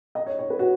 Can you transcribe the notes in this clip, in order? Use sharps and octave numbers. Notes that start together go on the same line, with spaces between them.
D#5
C#5
C#5
B4
F#4